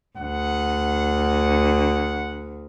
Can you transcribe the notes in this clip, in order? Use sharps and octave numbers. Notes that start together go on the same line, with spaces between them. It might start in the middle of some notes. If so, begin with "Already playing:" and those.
D2 F#5